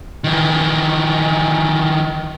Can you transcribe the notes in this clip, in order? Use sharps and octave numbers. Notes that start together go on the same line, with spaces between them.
D#3 E3